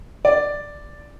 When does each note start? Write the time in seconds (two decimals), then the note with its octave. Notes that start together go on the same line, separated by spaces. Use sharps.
0.25 D5